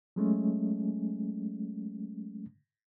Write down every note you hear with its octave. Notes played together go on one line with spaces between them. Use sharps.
F#3 G#3 A3 C#4